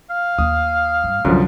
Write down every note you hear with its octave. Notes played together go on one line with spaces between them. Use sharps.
F5
D#2 D#6
G2
C2 F#2 D3 F3 F#3